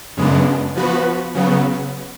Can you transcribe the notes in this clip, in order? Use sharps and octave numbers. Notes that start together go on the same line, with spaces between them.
F#2 C#3 G#3 B3 D4
F3 B3 F#4 B4
C#3 F#3 B3